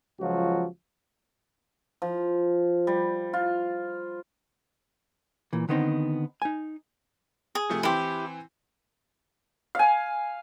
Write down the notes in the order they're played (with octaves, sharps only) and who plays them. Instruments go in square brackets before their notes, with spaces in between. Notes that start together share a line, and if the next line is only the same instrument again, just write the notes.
[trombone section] C#2 F3 F#3 F#4
[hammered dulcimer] F3
G3
F4
[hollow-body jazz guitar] A#2 E3
D3 D#3 B3 C4 D#4
D#4 G#5
[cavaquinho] G#4
[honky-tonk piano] C3 F3 A3
[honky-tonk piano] E3 C4 C6 [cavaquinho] E4 G4
[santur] F5 G#5